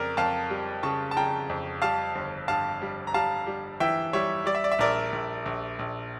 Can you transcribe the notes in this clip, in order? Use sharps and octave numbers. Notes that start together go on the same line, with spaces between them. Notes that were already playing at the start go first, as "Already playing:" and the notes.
Already playing: F2 C#3 A#4 D5
F2 F5 A5
G3
C#3 A5 C#6
A5
C#3 G5 A#5
F2
G3 F5 A5
G1
G2 F5 A5
G3
A#5
G3 F5 A5
G3
E3 E5 G5
G3 C#5 E5
G3 D5
E5
D5
E5
A#1 A#4 D5
A#1
A#1
A#1